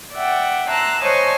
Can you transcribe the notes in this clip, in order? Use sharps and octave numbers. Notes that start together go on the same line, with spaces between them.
D5 E5 F#5 G5
A5 A#5 C6 E6 F#6
C5 C#5 D#5 G#5 A5 C#6